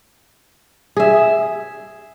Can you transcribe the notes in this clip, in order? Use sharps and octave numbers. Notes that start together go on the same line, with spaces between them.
G#4 E5